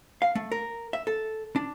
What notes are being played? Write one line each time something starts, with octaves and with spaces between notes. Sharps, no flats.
F5
A3
A#4
E5
A4
D4